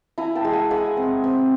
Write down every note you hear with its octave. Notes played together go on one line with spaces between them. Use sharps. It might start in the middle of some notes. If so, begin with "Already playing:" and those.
E4 G#5 A#5
G5 A5
G#3
F#5 G#5
G#3 F#5 G#5
C4
C4